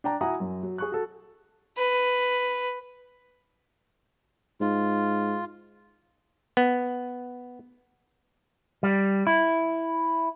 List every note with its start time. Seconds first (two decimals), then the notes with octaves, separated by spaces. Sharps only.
0.04 D4 G5 A#5
0.21 E4 F#4 F#5 G#5 A#5 D#6
0.40 F#2
0.63 F#3
0.78 G#4 C#6 F#6
0.92 F#4 A4
1.77 B4
4.61 G#2 F4
6.57 B3
8.83 G3
9.27 E4